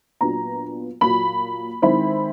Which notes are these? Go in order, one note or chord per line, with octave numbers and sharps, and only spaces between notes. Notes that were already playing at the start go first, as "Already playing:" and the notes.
A#2 F#3 B3 D4 A#5
A#2 F#3 A#3 B5
D#3 G#3 C4 E4 B5